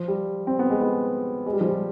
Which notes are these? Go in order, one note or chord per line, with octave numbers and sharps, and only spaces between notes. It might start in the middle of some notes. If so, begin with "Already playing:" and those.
Already playing: F3
G3
C4
B3
G#3
B3
G#3
G3
F3
G3